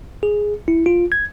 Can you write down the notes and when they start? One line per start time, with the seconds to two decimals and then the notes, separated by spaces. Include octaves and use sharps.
0.23 G#4
0.68 E4
0.86 F4
1.12 G#6